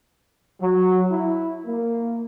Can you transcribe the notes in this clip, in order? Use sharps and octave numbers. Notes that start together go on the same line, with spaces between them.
F#3
E4
A#3